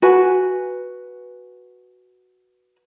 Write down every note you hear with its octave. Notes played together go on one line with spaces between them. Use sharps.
F#4 B4 G#5